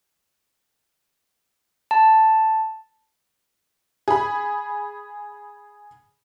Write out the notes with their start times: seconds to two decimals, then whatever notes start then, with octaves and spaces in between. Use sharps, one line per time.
1.91 A5
4.08 G#4 B5